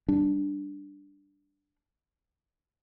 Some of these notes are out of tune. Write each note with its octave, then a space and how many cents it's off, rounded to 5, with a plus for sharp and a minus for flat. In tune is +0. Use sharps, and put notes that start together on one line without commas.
G3 +0 D4 +0